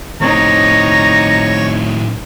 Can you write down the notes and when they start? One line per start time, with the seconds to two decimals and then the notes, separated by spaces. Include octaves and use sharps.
0.21 A2 C4 D#4 C#5 A#5 C#6